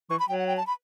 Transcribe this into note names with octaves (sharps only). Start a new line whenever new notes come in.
E3 C#6
B5
F#3 G5
F#5
G5
A5
B5